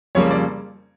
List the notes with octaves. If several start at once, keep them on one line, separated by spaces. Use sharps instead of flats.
F2 C#3 G3 A#3 C#5
D5